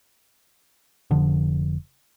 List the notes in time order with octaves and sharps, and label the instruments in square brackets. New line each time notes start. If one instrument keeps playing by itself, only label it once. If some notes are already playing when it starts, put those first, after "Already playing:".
[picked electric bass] F1 D3 F3